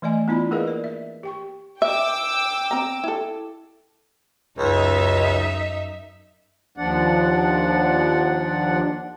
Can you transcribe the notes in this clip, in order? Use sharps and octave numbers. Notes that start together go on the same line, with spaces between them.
E3 A3 D5 D#5 G#5
B3 D4 E4 F4 D5 B5
A#3 G#4 A#4 B4 D#5 F5
D5
E5
G4 G5 C#6
E5 G5 D6 E6
C4 A#5
E4 A4
C#2 F#2 D#4 E5
D#2 F3 D4 D5 F#5